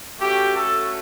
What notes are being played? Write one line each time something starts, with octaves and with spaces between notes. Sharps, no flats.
A3 C#4 F#4 G4
A4